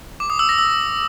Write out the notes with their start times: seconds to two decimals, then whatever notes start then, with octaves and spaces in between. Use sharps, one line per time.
0.20 D6
0.30 D#6
0.39 E6
0.49 A#6
0.59 E6